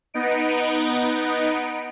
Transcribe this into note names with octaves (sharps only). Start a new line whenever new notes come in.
B3 D#4 D7